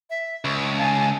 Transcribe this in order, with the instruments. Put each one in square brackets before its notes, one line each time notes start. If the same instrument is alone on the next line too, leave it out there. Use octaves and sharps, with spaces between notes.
[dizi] E5
[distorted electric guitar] C#2 [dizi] C#6
[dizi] F5 [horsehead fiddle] G#5 A5